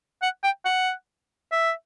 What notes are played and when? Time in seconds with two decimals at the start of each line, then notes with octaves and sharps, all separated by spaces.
0.22 F#5
0.44 G5
0.65 F#5
1.52 E5